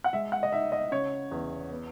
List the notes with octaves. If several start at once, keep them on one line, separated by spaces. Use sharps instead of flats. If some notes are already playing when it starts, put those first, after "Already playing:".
F#5
G#3 E5
F#5
D#5
D#4 E5
D#5
C#3 C#5
E2
B3